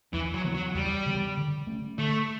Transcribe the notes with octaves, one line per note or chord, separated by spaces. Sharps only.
E2 E3
F#3
C#3 E3 B3
F#3
E2 G3
C#3 E3 B3
D3
A3 C#4
D3 A3